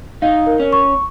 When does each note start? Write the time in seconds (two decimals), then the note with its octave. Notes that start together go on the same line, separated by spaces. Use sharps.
0.22 D#4 F5
0.47 A#4
0.59 C#4
0.73 C#6